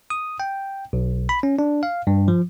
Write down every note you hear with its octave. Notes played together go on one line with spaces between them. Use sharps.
D#6
G5
B1
B5
C#4
D4
F5
G2
F3